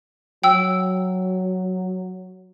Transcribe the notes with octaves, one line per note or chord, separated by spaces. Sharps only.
F#3 G5 E6